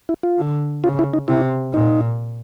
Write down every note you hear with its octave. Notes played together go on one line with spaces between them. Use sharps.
E4
F4
D3
C#3 F4
E4
D#4
C3 E4
A#2 D#4